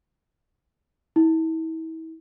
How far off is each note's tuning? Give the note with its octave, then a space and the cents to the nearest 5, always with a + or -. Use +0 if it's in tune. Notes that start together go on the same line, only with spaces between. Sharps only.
E4 -35